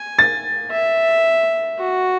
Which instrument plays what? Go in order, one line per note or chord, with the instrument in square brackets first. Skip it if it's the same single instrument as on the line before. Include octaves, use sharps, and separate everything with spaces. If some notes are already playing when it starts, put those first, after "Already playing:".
Already playing: [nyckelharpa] G#5
[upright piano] A6
[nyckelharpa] E5
F#4